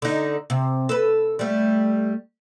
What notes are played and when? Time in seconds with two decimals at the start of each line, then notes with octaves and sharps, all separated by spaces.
0.02 D3 D#4
0.50 C3
0.89 A4 B4
1.39 G3 A3